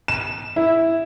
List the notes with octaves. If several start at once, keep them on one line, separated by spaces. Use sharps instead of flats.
E7
E4